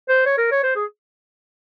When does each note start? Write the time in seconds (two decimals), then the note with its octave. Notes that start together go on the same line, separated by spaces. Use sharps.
0.09 C5
0.26 C#5
0.38 A#4
0.51 C#5
0.63 C5
0.76 G#4